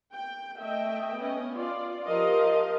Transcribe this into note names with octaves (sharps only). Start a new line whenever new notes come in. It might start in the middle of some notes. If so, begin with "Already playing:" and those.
G5
A3 D#5 E5 G5
B3 C#4 D#5
F4 D5
F3 G4 A#4 D#5 F5